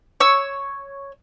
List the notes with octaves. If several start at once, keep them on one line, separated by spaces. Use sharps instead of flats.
C#5 E6